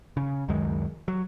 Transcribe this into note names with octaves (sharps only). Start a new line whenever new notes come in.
C#3
C#2 F#2 D#3 G#3
F#3